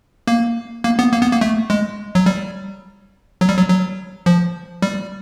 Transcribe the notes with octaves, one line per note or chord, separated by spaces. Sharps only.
A#3
A#3
B3
A#3
B3
A#3
A3
G#3
F#3
G3
F#3
G3
F#3
F#3
F3
G3